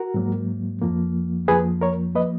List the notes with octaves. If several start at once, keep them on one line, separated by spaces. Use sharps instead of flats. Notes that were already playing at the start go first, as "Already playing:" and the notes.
Already playing: F#4 A#4
G#2 F#3 A#3
F2 F3 A#3
F2 F3 A#3 G#4 B4
A#4 C#5
F3 A#3 B4 D#5